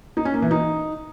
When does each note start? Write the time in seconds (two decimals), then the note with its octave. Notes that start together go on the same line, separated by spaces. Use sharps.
0.17 D#4
0.25 C#4
0.34 A#3
0.42 E3
0.51 D#4